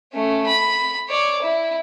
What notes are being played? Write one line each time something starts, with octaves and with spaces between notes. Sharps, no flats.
A3 C#4
B5
C#5 D5
E4